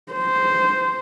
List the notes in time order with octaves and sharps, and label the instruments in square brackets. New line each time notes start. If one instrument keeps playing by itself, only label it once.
[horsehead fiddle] C5